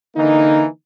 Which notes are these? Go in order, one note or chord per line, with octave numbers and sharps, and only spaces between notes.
D3 E3 A#3 D#4